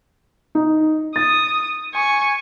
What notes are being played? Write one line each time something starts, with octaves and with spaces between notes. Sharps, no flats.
D#4
D#6 A6
G#5 C#6